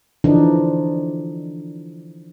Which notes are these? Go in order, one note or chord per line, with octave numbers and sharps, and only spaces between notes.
D3 E3 F3 D4 D#4